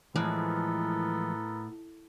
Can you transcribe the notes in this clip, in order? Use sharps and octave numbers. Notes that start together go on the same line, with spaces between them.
A2 E3 F3 G#3 B3 A4 A#4